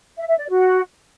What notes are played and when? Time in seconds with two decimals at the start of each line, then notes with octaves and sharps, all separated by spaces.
0.17 E5
0.28 E5
0.38 D5
0.49 F#4